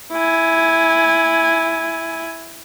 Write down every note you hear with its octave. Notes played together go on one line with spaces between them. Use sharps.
E4 G#5